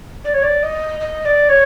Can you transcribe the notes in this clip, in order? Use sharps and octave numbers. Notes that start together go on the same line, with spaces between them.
D5
C#5
D5
D#5
D#5
D5
C#5